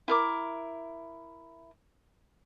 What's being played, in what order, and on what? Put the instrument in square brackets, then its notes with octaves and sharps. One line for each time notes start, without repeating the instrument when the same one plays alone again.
[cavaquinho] E4 A#4 D6